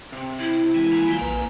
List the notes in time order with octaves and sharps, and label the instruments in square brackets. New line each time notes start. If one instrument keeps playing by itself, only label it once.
[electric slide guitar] C3
[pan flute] E4
[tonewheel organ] E3 G#3
[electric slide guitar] A#3 G#5 A#5
[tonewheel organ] E3 G3 F4
A#1 B4